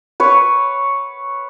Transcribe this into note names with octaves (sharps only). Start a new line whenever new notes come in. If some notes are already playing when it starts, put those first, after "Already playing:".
B4 C#5